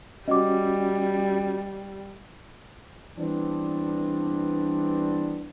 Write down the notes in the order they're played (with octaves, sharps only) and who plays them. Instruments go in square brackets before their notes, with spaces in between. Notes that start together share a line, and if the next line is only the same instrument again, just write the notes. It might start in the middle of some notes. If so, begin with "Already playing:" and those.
[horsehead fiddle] G3 [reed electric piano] C#4 F#4 [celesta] D#5 D6
[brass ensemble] E3 G3 B3 C4 D4